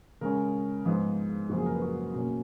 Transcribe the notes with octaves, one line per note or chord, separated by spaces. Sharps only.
C#3 G#3 C#4 A#4
G#2 F3 B3 F4
F#2 C#3 F3 A#3 F#4
G#4
A#4
B4
F#4
B2 A#3 C#4